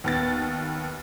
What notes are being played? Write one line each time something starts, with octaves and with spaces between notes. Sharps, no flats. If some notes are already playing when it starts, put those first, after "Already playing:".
D#2 B3 A6